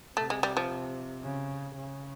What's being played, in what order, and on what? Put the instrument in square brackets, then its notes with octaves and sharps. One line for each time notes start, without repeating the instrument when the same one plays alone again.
[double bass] C3 [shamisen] A3
[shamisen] G#3
G3
F3
[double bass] C#3
C#3